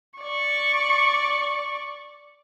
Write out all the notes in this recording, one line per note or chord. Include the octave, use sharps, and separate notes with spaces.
D5 C#6